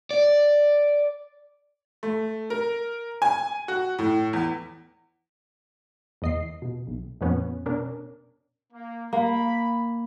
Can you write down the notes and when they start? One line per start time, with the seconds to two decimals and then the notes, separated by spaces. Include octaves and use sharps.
0.11 D5
2.03 A3
2.50 A#4
3.22 G#5
3.68 F#4
3.99 A2
4.33 E2
6.22 E2 D#5 C7
6.62 B2
6.87 B1
7.21 F2 A#2 F3 B3 C#4
7.66 B2 C#4 D4 A#4
8.72 A#3
9.13 A#3 B5